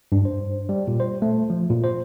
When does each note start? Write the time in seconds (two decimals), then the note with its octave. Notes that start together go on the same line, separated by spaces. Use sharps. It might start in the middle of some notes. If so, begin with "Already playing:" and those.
0.12 G2
0.25 C5
0.69 G3
0.88 A#2
1.00 C5
1.22 A3
1.50 F3
1.70 A#2
1.84 C5